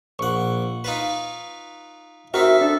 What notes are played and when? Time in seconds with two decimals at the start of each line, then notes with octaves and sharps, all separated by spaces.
0.19 A#1 F#5 C#6
0.84 D#4 F4 B4
2.34 C4 D#4 F#4 A#4 E5 F6
2.61 D4 A4